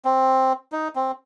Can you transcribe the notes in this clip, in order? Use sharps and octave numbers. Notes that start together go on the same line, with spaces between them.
C4
D#4
C4